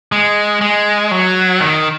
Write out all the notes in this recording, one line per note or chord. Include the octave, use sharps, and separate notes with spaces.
G#3
G#3
F#3
D#3